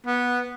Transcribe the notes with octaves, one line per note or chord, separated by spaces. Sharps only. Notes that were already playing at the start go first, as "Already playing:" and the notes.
B3